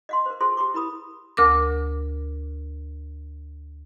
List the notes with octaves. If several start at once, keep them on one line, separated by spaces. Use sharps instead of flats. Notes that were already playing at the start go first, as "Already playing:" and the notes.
D#5 F5 C6
A#4 C5
F4 G#4 A4 C5 C6
G4 A#5 C6 D6
E4 A#4 B5 D#6
D2 A#4 D6